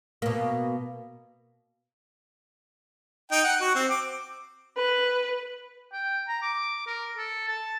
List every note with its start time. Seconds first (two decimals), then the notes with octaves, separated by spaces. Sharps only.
0.22 B2 A#3
3.31 D#4 G5
3.44 F#5
3.61 F#4
3.75 C4
3.90 D6
4.77 B4
5.92 G5
6.28 A#5
6.42 D6
6.87 A#4
7.17 A4
7.47 A5